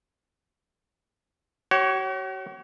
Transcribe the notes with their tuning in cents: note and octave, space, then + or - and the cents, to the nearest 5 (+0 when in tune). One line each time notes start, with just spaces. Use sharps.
F#4 +45 C#5 -10